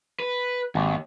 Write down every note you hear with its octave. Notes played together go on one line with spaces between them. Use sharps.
B4
G#1 D#2